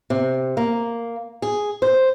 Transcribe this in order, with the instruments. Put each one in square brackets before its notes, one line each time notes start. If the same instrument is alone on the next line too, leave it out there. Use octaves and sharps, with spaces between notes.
[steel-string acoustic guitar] C3
A#3
G#4
C5